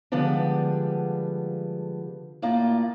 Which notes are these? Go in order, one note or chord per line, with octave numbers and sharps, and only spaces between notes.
D3 F3 G3 G#3 B3 D4
A2 A#3 F4 D5